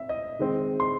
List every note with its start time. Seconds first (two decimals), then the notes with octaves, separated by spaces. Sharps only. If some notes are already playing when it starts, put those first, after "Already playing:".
Already playing: C4 E5
0.09 D#5
0.39 D#3 G#3 C4
0.80 C6